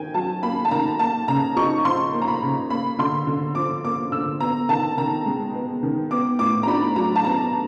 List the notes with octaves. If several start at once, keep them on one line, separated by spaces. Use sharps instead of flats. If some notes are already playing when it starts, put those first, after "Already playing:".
Already playing: D#3 G5 G#5
F#3 A5
A#3 B5
A5
D#3 A#5
A#3 A5
C#3 A#5
D#4 C#6
F3 C6
A#3
A#5
B5
C#3
A#3 B5
D3 C6
D3
F3 D6
A#3 D6
D3 E6
B3 A#5
D#3 A5
D#3 A#5
G#3
B3
D#3
B3 D6
A2 D6
A#5
D4 B5
F#3 A#5
A5
B3 A#5